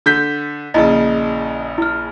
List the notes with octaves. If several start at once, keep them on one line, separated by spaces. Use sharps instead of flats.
D3 G6 B6
A#1 C#3 E4 D#5
E4 F6